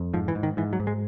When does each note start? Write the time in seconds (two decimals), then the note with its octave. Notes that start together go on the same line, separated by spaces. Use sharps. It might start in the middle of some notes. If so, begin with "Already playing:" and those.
Already playing: F2
0.13 G#2 F3
0.28 E3
0.35 G#2
0.43 D#3
0.57 G#2 E3
0.73 F#3
0.80 G#2
0.87 G#3